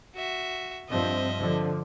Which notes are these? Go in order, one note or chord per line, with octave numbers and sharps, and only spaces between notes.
F#4 E5
G2 F3 C4 D#5 E5
D3 F3